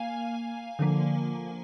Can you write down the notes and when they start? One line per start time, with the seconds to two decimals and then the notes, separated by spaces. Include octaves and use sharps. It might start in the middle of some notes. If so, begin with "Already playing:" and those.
Already playing: A#3 F5 G#5
0.79 D3 F3 A#3